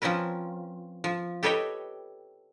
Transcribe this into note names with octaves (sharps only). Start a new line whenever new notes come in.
F3 C4 C#4 A#4 B4
F3
G4 A4 B4 C#5 D#5 G5